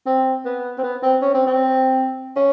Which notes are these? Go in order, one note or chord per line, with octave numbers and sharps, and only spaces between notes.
C4
B3
C4
B3
C4
C#4
C4
C4
C#4